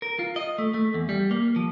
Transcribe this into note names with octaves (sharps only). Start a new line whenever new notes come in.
A#4
F4
D#5
A3
A3
E2
G3
A#3
F3